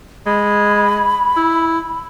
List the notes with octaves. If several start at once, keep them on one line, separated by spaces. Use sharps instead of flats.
G#3 B5
E4